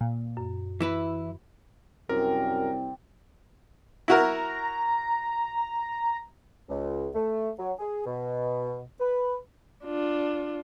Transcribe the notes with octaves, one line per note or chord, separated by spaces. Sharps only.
A#2
F#2
E3 E4 B4
C2 F#2 C4 A#4 D5 G5
E4 F#4 A#4 A#5
C#2
A3
F#3
G#4
B2
B4
D4 F4